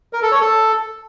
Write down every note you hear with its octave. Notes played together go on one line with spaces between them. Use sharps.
A#4
A4
C#5
A4